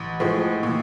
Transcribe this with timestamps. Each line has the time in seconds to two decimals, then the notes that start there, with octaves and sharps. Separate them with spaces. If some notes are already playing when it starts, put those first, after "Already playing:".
Already playing: A1
0.20 A2 F3 G#3
0.63 A#2